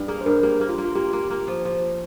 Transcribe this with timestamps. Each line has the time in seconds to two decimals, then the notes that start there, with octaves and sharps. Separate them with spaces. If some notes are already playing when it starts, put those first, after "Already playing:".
Already playing: G2
0.08 A#3 G#4
0.21 C5
0.25 G2 A#4
0.43 A#3 G4
0.61 A#3
0.69 F4
0.78 A#3
0.84 F4
0.95 A#3 G4
1.13 A#3
1.30 A#3
1.48 F3
1.65 F3